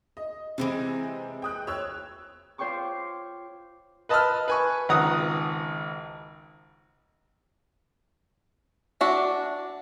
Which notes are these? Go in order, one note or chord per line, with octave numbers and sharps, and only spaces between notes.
D#5
C3 E3 F3 G#3 C4
G5 D#6 F#6
C#5 E6 F#6
F4 C5 C#5 G5 C#6 D6
B4 D#5 A5 B5 E6 F6
B4 G#5 C#6
G#1 C#2 F#5 A#5 D#6
D4 F#4 E5